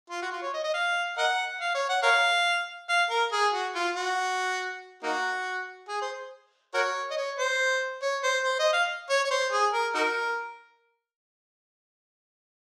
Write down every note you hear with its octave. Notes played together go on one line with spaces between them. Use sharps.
F4
F#4
F4
C#5
D#5
D#5
F5
A#4 D#5 F#5
F5
C#5
F#5
A#4 C#5 F5
F5
A#4
G#4
F#4
F4
F#4
A#3 D#4 F#4
G#4
C5
F#4 A#4 C#5
D#5
C#5
C5
C#5
C5
C5
D#5
F5
C#5
C#5
C5
G#4
A#4
D#4 F#4 A#4